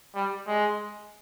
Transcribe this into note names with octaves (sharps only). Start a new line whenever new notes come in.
G3
G#3